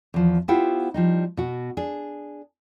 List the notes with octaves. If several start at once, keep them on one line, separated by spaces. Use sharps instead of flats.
E2 F3
B3 E4 F4 G4 C5 F#5
F3 G3 D#4
B2 F#4
D4 G#4